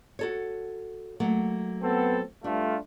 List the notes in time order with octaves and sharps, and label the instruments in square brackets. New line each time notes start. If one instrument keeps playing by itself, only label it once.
[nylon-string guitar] F#4 A4 C#5
F#3 A3 A#3
[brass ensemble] B3 C4 A4
[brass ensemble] G2 A3 F4 [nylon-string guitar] D4